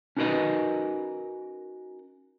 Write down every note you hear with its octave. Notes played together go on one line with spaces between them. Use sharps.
C#4 D#4 F#4 A#4 B4 D#5